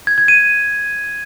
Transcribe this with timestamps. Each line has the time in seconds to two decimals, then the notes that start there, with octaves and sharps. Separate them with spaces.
0.07 G#6
0.18 G#6
0.28 D#7